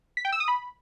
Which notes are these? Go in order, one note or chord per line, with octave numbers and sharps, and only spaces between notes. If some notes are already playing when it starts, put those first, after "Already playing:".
B6
G5
E6
D#6
B5